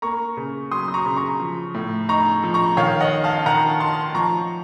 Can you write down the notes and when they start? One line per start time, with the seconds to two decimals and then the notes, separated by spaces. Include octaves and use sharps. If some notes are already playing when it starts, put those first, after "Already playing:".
0.02 A#3 A#5 C#6
0.37 C#3
0.71 F#3 C6 D#6
0.88 D#6
0.94 A#5 C#6
1.05 C#3
1.17 A#5 C#6
1.40 F3
1.74 A2
2.09 D#4 A#5 C#6
2.43 F3
2.54 A#5 C#6
2.77 D#3 C#5 F5
3.00 D#5 F#5
3.12 D#4
3.24 F5 A5
3.46 D#3 F#5 A#5
3.80 D#4 A5 C6
4.15 F3 A#5 C#6